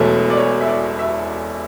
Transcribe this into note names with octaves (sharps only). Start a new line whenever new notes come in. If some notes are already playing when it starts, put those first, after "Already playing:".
Already playing: E1 E2 B2 F#3 A3 B4
D5
C#5
E5
D5
E5